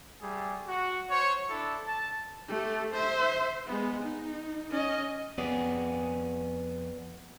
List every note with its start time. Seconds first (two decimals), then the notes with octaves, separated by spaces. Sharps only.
0.22 G3 A3 G#4
0.68 F#4
1.10 C5 C#5
1.49 D4 E4 A4
1.86 A5
2.48 A3 G4
2.92 C5 E5
3.67 G#3 B3
4.02 D#4
4.71 C#4 D#5
5.38 F2 B3 C#4 G#4 D5